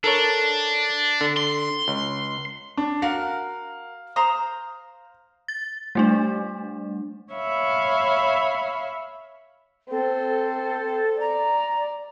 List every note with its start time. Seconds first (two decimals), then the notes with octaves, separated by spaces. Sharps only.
0.04 D4 A4 A#4 C#5
1.21 D3
1.37 C6
1.88 C#2
2.77 D4
3.02 F#4 A#4 F5
4.16 C5 A#5 D#6
5.48 A6
5.95 G3 A3 D4
7.33 C#5 E5 F5 B5
9.91 C4 A4
11.20 D5 A#5